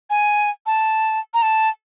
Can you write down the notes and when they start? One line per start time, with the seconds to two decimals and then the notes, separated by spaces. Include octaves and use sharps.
0.10 G#5
0.66 A5
1.34 A#5
1.42 A5